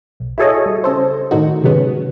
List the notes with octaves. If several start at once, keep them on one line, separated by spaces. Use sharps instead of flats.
B1
E4 F#4 G#4 A4 C#5 D#5
G3
C#3 A4 C5
A2 D#3 D#4 F#4
C3 D#3 F#3 G#3 B3 C#4